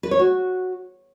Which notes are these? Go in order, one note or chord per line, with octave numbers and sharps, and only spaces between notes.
B4
C#5
F#4